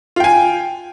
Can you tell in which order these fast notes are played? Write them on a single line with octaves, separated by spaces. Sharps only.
F4 G5 G#5